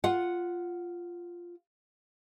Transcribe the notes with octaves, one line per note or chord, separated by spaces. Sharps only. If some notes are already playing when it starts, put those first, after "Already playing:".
F4 F#5